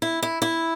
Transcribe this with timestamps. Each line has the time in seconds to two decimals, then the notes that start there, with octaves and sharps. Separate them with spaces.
0.02 E4
0.23 E4
0.42 E4